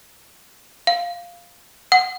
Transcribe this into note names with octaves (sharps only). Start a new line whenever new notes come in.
F5
F#5